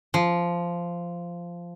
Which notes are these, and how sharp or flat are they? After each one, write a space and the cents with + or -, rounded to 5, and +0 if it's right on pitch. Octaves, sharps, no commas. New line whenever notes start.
F3 -10